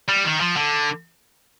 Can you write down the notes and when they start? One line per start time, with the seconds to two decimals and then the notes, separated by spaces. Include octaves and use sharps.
0.09 G3
0.25 D#3
0.41 F3
0.57 D3